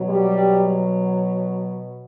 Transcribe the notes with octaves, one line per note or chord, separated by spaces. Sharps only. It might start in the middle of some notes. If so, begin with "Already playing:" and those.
Already playing: B2 F#3
G3